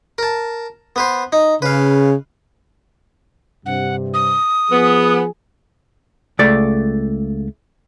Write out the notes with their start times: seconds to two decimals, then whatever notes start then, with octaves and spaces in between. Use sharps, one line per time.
0.18 A#4 A5
0.96 B3 B4 C5
1.32 D#4
1.62 C#3 B4 F5
3.66 G2 C3 F#5
4.14 D#6
4.71 F3 B3 G#4
6.39 C#2 A3 D5